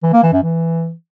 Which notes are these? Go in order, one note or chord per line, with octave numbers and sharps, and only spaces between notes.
E3
A#3
E3
F#2
E3